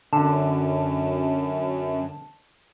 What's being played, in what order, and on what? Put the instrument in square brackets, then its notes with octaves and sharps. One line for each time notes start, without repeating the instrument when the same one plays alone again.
[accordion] F#2 [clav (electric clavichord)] D3 [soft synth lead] A5